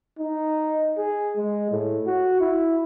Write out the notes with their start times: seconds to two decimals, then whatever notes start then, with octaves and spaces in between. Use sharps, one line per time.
0.19 D#4
0.97 G#4
1.37 G#3
1.72 A2
2.07 F#4
2.41 E4